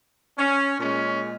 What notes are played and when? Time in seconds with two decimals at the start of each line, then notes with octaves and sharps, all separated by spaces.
0.38 C#4
0.78 A#2 G#3 C#4